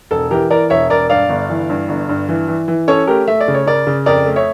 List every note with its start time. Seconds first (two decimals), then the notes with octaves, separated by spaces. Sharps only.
0.11 E1 A4
0.31 E3 G4 A#4
0.50 E3 A#4 D5
0.70 E1 C#5 E5
0.90 E1 A#4 D5
1.10 G2 D5 F5
1.29 G1
1.50 E3
1.69 G2
1.89 G1
2.09 G2
2.29 E3
2.48 E3
2.68 E3
2.88 C#4 A4 C#5
3.07 A3 G4 A#4
3.28 A3 E5
3.40 D5
3.48 C#3
3.54 C#5
3.67 C#3 A#4 D5
3.87 C#3
4.06 F2 A#4 D5
4.26 A3
4.36 C#5 E5